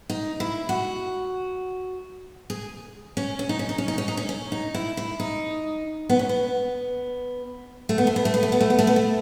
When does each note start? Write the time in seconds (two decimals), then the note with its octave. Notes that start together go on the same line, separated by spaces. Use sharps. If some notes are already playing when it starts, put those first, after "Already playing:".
0.10 D#4
0.40 E4
0.69 F#4
2.50 G#4
3.17 C#4
3.39 C#4
3.49 D#4
3.59 C#4
3.69 D#4
3.78 C#4
3.88 D#4
3.98 C#4
4.08 D#4
4.17 C#4
4.29 C#4
4.52 D#4
4.74 E4
4.97 E4
5.20 D#4
6.09 B3
6.19 C#4
6.29 B3
7.89 A3
7.98 B3
8.07 A3
8.16 B3
8.25 A3
8.34 B3
8.43 A3
8.52 B3
8.60 A3
8.70 B3
8.79 A3
8.87 B3
8.96 A3